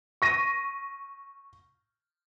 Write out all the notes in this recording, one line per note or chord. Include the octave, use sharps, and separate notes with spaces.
C#6 A#6 D#7